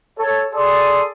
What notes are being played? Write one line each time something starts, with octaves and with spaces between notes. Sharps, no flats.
A4 C#5
G#4 A4 D5 C6 D#6